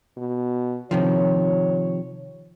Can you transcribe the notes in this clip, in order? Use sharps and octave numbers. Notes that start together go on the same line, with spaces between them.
B2
C3 D#3 F3 C#5